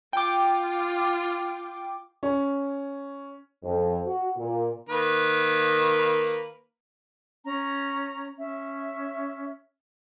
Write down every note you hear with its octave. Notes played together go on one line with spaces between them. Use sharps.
F4 G5 D6
C#4
F2
F#4
A#2
D#3 A#3 B4
C#4 A#5
C#4 E5